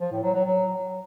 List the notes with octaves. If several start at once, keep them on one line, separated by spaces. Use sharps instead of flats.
F3
A2
F#3
F#3
F#3